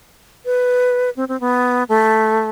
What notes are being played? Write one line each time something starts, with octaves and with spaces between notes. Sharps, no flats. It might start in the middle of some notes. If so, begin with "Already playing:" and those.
B4
C4
C4
B3
A3